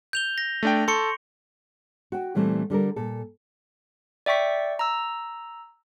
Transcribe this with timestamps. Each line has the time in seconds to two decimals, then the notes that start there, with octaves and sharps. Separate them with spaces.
0.13 G6 F7 G7
0.38 A#6
0.63 A3 D4 G5
0.88 A4 C6 C#6 C#7
2.12 F#4 G5
2.35 A#2 E3 G3 A3 C4
2.70 D3 G3 A4 A#4
2.96 A#2 A4
4.26 D5 E5 G5 C#6 B6
4.79 A#5 E6